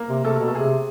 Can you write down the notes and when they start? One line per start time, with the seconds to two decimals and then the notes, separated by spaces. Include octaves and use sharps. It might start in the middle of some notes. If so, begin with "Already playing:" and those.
Already playing: A#3 A#4
0.09 C3
0.24 C3 A3 A4
0.39 B2
0.48 A4
0.55 C3 G#4